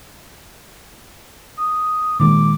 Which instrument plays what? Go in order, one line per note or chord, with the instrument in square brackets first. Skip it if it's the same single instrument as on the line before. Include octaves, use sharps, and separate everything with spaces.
[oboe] D#6
[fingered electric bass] A#2 D#3 G#3 [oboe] D6